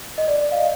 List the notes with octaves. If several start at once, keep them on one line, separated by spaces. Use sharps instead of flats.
D#5
D5
F5
D#5